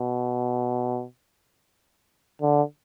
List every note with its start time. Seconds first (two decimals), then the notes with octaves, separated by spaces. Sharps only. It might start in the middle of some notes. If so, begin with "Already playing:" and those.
Already playing: B2
2.42 D3